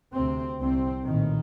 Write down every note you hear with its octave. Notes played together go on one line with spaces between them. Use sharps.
D2 C3 C4
C2 C3 C4
A#1 A2 D#3